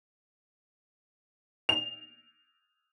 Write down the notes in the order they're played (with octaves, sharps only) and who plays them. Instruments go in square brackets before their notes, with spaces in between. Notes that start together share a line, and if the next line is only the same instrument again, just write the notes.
[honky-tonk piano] F7